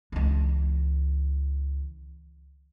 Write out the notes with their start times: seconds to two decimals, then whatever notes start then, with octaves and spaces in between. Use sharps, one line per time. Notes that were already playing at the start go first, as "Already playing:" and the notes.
0.12 C#2 E3